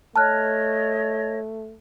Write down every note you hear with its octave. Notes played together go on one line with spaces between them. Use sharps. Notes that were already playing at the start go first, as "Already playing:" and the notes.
A3 C#5 D#5 A5 F6 F#6